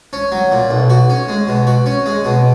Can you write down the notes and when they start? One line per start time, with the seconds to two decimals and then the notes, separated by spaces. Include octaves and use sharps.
0.13 C#4
0.32 F#3
0.52 A#2
0.71 B1
0.90 F#4
1.10 C#4
1.28 G#3
1.48 B2
1.67 F#4
1.86 C#4
2.06 G#3
2.25 B2